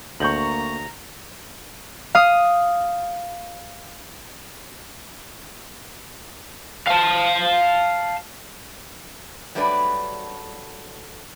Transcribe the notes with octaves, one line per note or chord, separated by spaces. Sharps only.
D2 A#3 A#5 C#6 G6 F#7
F5 D#6
F5 A5
F#3 G3 A3 D4 B4 D5